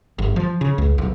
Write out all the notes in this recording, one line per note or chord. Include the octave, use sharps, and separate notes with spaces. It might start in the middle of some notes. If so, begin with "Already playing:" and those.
G1
F3
C#3
C#2
B1